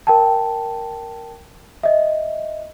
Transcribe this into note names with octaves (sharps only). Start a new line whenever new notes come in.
A#4 G5 A5
D#5 E5